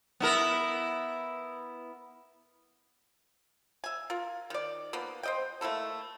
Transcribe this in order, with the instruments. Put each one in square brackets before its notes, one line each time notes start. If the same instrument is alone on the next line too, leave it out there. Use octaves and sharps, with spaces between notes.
[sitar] B3 E4 A#4
[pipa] E5 G#5
F4 A#4
D#3 D5
F3 A#3 B3
C5 D#5 G5
A3 A#3 E4 A4